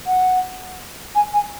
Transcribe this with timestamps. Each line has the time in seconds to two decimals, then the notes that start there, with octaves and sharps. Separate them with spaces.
0.06 F#5
1.15 G#5
1.33 G#5